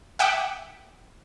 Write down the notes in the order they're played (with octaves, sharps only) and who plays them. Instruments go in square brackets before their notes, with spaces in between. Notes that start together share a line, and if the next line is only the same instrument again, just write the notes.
[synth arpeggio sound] E5 F#5 G5 D6